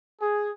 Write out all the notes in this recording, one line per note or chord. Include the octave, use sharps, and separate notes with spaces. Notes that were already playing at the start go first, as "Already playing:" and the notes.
G#4